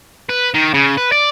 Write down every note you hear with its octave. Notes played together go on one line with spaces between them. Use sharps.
B4
D#3
C#3
B4
D5